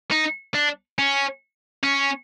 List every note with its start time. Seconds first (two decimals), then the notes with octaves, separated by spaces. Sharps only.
0.12 D#4
0.55 D4
0.99 C#4
1.84 C#4